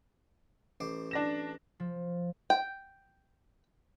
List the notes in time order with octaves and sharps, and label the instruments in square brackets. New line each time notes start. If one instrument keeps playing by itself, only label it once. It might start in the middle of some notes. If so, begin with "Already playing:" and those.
[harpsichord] A1 C5 D6
[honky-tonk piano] D4 A#6 E7
[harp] F3
[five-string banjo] G5